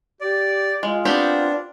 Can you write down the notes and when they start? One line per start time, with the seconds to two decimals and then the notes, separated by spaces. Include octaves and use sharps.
0.21 G4 D5
0.83 G#3 F4
1.05 B3 C4 D4 G4